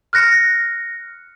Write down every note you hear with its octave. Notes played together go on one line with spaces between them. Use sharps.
F6 F#6 A#6 C#7